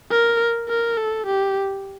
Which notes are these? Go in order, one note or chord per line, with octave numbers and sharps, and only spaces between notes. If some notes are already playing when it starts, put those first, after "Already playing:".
A#4
A#4
A4
G4